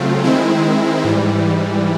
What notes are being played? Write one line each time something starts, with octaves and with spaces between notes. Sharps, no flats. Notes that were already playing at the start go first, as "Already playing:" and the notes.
Already playing: C#3 F#3 A3 C4 F4
D#3 G#3 C4 E4
G#2 E3 G3